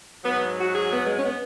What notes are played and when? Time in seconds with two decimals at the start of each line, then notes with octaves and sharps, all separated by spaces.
0.24 G#2 F#3 B3
0.57 F#4
0.73 G#4
0.90 B3
1.06 G#3
1.16 C#4
1.23 B3